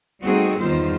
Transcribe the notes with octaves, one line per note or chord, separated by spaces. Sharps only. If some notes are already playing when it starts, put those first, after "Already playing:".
G3 A3 C4 D#4 F#4 G#4
E2 G2 D#3 G3 F4 C5